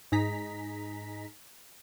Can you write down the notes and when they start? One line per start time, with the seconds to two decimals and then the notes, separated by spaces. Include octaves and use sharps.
0.12 G#2 D#4 G#4 A#5 B6